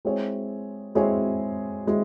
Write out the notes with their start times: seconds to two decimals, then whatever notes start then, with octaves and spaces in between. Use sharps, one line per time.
0.05 G#3 C4 E4 G#4 C#5
0.95 G#3 C4 E4 G#4 C#5
1.87 G#3 C4 E4 G#4